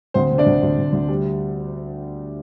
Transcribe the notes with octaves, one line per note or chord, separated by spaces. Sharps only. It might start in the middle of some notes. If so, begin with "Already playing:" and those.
D2 C4 C5
C3
D4 D5
D2
D2
D2
D2
G3